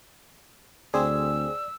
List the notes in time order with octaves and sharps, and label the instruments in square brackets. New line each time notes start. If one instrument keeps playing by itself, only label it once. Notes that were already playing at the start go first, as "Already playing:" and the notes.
[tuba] D2 [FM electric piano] C4 G#4 [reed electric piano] D5 [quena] E6